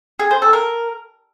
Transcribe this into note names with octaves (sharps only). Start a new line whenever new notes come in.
G#4
C5
A4
A#4